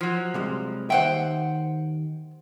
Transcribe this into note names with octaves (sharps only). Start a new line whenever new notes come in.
F3 F#3
C3 G3 G#3
D#2 D#3 C5 E5 F#5 G5